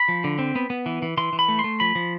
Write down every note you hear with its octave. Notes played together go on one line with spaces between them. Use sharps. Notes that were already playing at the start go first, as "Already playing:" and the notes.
Already playing: B5
F3
D3
C4
B3
B3
E3
E3
E3 C6
E3
B5
A3
C6
A3
F3 B5
F3